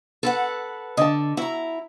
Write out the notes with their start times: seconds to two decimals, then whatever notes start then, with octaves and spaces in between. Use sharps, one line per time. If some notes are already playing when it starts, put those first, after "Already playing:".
0.23 A4 B4 F#5
0.97 D3 D#5 A5
1.37 E4 F#4 A#5